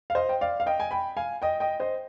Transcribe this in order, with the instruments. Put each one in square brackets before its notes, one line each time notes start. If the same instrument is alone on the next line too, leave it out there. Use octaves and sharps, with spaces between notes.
[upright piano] F5
C5 D#5
G5
D5 F5
F5
D#5 G5
G#5
G5 B5
F5 G#5
D#5 G5
D#5 G5
C5 D#5